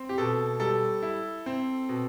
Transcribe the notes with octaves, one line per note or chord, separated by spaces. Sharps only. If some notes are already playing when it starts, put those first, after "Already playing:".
Already playing: C4
G4
B2 A4
G3 A4
E4
C4
B2